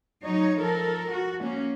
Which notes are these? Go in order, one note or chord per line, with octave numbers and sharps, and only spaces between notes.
F#3 D#4 C#5
F3 A4 A#4
F#4
A#3 C#4